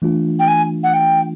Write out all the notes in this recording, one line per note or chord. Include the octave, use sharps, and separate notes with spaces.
E3 A3 D4 F4
G5
G#5
F#5
G5